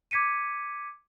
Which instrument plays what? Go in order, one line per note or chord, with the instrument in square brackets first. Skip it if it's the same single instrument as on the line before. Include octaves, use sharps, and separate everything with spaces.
[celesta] D6 G#6 B6 C#7 D#7